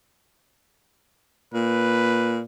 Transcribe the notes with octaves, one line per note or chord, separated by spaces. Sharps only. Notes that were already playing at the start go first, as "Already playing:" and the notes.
A#2 B4